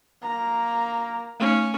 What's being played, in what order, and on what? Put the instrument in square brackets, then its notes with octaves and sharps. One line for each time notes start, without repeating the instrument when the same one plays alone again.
[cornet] A#3 [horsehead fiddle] A#5
[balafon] A3 D#4 [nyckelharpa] C#4